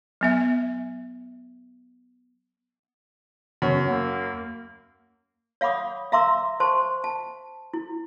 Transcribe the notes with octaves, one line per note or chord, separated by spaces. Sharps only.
F#3 B3 E5
F#2 C#3 B3 C#5
A#3 F#5 B5 E6
C#5 F5 F#5 B5 D6 D#6
E5 F5 A#5 C6 D6 E6
C5 A5 C6 C#6
A5
E4